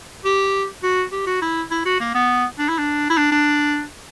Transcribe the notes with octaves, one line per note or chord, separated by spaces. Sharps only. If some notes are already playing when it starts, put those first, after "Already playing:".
G4
F#4
G4
F#4
E4
E4
F#4
A#3
B3
D4
E4
D4
E4
D4
D4